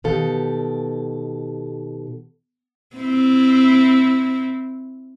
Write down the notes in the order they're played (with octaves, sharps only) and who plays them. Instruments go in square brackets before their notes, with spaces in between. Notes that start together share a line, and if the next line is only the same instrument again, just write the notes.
[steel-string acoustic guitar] B2 D#3 G4 A4 F5
[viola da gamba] C4 E4